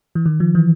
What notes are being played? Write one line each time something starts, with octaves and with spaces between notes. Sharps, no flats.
E3
D#3
F3
E3